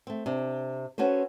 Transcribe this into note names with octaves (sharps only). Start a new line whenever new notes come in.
A3 C4
C3 D4
C#4 F#4 A4 B4 C5